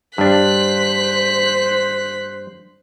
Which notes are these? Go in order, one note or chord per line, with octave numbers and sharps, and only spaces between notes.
G2 D4 C5 F#6 B6